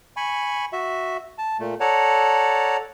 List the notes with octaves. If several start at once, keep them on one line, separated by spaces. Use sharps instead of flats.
G#5 B5 C#6
F#4 E5
A5
A#2 A3
A4 C#5 D5 F#5 A5 A#5